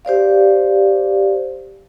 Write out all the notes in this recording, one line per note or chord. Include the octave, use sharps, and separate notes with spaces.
G4 C5 D5 F5